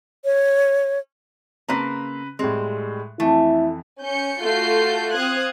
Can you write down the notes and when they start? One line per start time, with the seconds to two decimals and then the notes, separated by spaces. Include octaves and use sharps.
0.25 C#5
1.68 C#3 A#3 C4 B4 A#5
2.39 A2 G3 G#3 C4
3.20 F2 E3 A3 E4
4.01 C#4 G6 C#7
4.42 A3 F4 F#4 A4 G6 C7
5.15 C4 F5 D#6 F#6 G#6